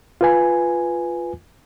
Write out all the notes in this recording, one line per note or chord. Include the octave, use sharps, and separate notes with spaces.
F4 B4 G#5